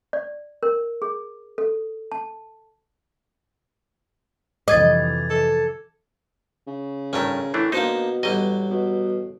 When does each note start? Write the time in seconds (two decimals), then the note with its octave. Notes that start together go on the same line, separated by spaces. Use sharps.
0.13 D5
0.63 A#4
1.02 G#4
1.58 A4
2.12 A5
4.68 F2 C3 E3 D#5 D6 G#6 A6
5.30 A4
6.67 C#3
7.13 G#1 G2 A3 C#4 A#4
7.54 A2 E3 A3 D4
7.72 B2 A#3 D4 D#4 C5
8.23 A1 F#3 G3 D#5
8.70 B2